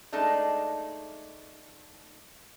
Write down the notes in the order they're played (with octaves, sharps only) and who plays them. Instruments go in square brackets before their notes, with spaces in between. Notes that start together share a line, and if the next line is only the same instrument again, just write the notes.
[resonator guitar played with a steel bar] G#3 A3 D4 D#4